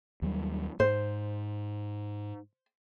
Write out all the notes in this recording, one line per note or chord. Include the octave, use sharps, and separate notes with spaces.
D#2 F#3 G3
G#2 C5